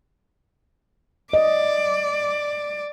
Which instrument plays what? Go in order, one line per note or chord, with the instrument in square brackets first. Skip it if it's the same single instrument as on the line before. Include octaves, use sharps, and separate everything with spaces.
[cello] D5 [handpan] D#5